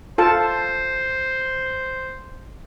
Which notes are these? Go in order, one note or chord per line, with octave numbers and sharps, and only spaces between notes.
F4 A4 C5 A5